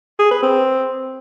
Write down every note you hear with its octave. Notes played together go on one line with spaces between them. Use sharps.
G#4
B4
C4